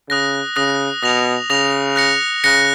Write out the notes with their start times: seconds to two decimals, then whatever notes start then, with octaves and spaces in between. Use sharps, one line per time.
0.09 C#3 D#6 F#6 A#6
0.56 C#3 D#6 F#6 A#6
1.03 B2 D#6 A#6 F7
1.50 C#3 D#6 A#6 F7
1.96 F#6 A#6 C#7
2.44 C#3 F#6 A#6 C#7